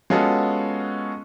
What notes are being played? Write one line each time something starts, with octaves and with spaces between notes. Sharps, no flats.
G#3 B3 C#4 F4 F#4 A4